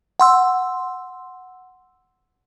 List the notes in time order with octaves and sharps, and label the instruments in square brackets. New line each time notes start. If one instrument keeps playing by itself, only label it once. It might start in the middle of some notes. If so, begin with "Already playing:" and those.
[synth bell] F#5 C6 E6